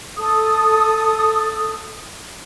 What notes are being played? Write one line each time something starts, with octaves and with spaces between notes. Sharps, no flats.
A4 D#6